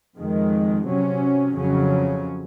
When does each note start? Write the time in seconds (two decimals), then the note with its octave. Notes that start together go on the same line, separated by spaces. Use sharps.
0.16 F2 D#3 G#3
0.86 C3 F#3 C#4
1.54 F2 C#3 F#3 C#4